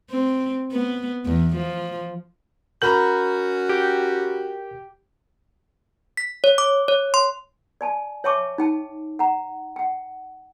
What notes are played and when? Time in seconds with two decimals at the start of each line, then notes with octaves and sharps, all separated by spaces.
0.10 C4
0.73 B3
1.26 E2
1.56 F3
2.82 C#4 F#4 A#4 A#5 B5 G6 F#7
3.69 G4
6.17 B6
6.44 C#5
6.58 D6
6.88 C#5
7.14 C6
7.81 D5 G#5 A5
8.24 C#5 E5 G5 A5 C#6 D6
8.58 D#4 G5 A5
9.19 F#5 A#5
9.76 F#5 G5